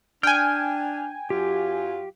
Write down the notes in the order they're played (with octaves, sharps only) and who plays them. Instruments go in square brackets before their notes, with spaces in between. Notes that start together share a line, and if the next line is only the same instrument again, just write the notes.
[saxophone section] D4 [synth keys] G5 G#5 [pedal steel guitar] F6
[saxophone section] F#2 F#3 F4 [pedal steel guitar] G4